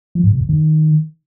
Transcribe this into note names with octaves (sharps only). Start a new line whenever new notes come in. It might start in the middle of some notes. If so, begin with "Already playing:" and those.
F3
G#2
C3
F2
D#3